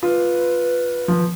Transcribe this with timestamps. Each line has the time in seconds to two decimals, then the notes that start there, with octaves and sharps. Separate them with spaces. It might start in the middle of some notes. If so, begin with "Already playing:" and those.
0.02 F4 B4
1.08 F3